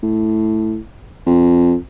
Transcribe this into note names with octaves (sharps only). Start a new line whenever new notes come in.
A2
F2